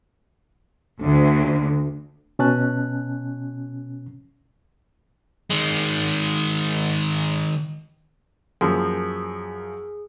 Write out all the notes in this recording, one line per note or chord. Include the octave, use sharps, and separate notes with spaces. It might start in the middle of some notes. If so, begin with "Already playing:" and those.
D2
B2 C#4 A5 F#6
D#3 G#3
F#2 F3 A#3 G#4